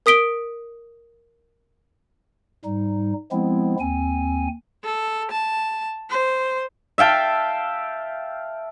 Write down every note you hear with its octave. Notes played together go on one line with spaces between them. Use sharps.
A#4 D#6 B6 D7 G7
G#2 G3 D#4
F3 G#3 B3 C4 E4
D#2 C4 G#5
A4
A5
C5
E5 F5 G5 A5